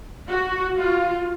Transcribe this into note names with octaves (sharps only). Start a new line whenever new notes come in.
F#4
F4